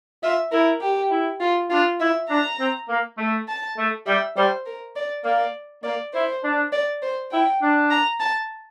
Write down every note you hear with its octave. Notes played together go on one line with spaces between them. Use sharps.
F4 E5
E4 A#4
G4
E4
F4
D4 F4
E4 E5
D4 A#5
C4
A#3
A3
A5
A3
G3 E5
G3 C5
A#4
D5
A#3 D5
A#3 D5
E4 C5
D4
D5
C5
E4 G5
D4
A#5
A5